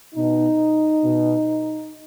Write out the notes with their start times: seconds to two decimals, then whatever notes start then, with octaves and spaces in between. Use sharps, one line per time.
0.15 B2 D#4
1.04 B2